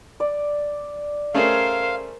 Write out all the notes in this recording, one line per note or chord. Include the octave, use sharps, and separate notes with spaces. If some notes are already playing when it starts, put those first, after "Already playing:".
D5
A3 C#4 G#4 A#4 C5 F5